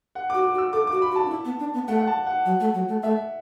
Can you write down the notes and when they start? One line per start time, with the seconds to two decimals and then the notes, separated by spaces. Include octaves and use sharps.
0.15 F#5
0.30 F#4 D6
0.44 D6
0.54 F#4
0.58 E6
0.73 A4 D6
0.87 F#4 D6
1.02 B5
1.11 F#4
1.16 A5
1.26 D4
1.30 E4
1.45 B3
1.60 D4
1.74 B3
1.88 A3 F#5
1.99 F#5
2.07 A5
2.27 F#5
2.45 F#3
2.60 A3
2.74 F#3
2.88 A3
3.03 A3 E5